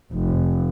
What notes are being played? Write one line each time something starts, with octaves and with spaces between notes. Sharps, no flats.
F1